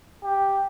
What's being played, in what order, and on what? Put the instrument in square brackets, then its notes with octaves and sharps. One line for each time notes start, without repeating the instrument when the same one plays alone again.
[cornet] G4